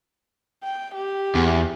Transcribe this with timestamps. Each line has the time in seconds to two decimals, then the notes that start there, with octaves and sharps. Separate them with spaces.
0.63 G5
0.95 G4
1.35 E2